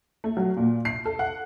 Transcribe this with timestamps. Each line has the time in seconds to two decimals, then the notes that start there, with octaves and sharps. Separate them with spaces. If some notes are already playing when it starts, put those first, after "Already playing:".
0.24 A3
0.37 F#3
0.57 A#2
0.85 C7
1.05 A4
1.19 F#5